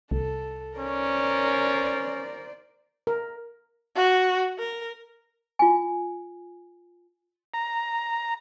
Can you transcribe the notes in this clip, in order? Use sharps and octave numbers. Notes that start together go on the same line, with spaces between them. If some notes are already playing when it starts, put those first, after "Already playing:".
C2 A4
C#4 A#4 C5 D5
A#4
F#4
A#4
F4 G#5
A#5